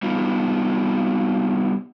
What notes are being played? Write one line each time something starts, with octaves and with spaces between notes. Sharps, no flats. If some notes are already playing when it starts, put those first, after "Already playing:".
G3 B3 D#4 F4